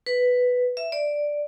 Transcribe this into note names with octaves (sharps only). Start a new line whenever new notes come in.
B4
E5
D5